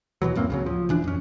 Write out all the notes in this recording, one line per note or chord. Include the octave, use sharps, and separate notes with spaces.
D#2 B2 E3 F#3
F#2 A2 A#3 C4
C#2 C#3 F#3
F3
D#1 E3 D4
F2 C#4